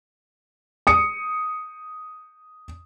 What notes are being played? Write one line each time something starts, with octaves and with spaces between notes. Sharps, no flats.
D#6 C#7